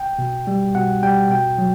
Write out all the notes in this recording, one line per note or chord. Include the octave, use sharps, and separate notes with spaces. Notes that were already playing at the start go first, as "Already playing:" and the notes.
Already playing: G5
B2
G3
B2 F#5
G3 G5
B2 G5
F#3